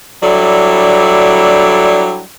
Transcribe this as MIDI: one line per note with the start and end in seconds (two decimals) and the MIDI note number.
0.23 2.21 54
0.23 2.21 55
0.23 2.21 62
0.23 2.21 64
0.23 2.21 69
0.23 2.21 74